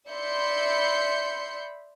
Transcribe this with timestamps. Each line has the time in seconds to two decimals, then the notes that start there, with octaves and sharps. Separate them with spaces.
0.10 D5 E5 B5 C6 G6 C#7